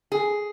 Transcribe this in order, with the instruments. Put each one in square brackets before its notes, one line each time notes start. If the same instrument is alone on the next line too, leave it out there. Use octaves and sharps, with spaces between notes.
[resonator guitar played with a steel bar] G#4